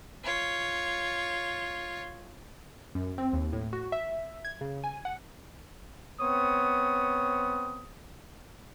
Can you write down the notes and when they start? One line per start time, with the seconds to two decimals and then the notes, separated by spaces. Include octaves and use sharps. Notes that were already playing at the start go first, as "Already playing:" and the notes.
0.24 F4 C#5
2.95 F#2
3.18 C4
3.33 D#2
3.53 A2
3.73 F#4
3.92 E5
4.45 G#6
4.61 C#3
4.84 G#5
5.05 F#5
6.21 B3 C4 C#5 D#6